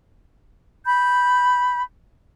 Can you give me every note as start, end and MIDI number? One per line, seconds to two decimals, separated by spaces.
0.86 1.82 83
0.86 1.82 91